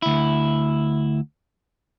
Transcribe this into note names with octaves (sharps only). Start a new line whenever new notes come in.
D2 E4